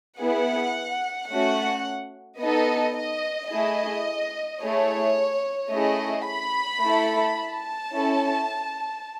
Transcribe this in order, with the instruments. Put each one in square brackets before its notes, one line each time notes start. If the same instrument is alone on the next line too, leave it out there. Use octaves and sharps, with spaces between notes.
[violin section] B3 E4 G#4 F#5
A3 C#4 F#4 F#5
B3 D#4 A4 D#5
D#5
A3 E4 G#4 D#5
A3 E4 G#4 C#5
A3 C#4 E4 G#4 D#5
B5
A3 E4 A4
A5
C#4 E4 A4